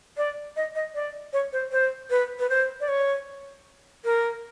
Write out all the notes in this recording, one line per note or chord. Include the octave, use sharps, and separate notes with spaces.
D5
D#5
D#5
D5
C#5
C5
C5
B4
B4
C5
D5
C#5
A#4